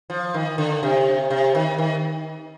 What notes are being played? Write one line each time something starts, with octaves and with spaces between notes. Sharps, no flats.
F3
D#3
D3
C3
C3
D#3
D#3